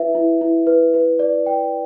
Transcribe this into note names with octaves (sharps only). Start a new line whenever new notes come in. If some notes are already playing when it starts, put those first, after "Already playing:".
Already playing: E4 B4 E5
E4
E4
B4
B4
D5
G5